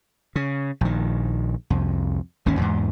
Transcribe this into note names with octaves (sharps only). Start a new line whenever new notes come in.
C#3
A#1 D#3
C2 F2
G#1 D#2 D#3 C#4
E2 G#2